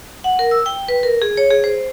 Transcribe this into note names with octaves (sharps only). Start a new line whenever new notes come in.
F#5
A#4
E6
G5
B4
A#4
G#4
C#5
G#4
C5